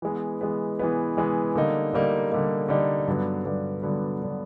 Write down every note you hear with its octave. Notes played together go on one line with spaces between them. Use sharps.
E3 G#3 B3
E3 G#3 B3
E3 G#3 B3
E3 G#3 B3
D3 G3 A#3 D#4
D3 G3 A#3 D#4
D3 G3 A#3 D#4
D3 G3 A#3 D#4
G2 D3 F#3 B3
G2 D3 F#3 B3
G2 D3 F#3 B3
D3 F#3 B3